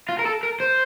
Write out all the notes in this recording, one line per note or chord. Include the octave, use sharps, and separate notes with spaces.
F4
A#4
A4
A#4
C5